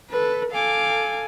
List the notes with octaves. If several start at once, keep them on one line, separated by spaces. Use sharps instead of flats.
A4 B4
A4 F5 G#5 D6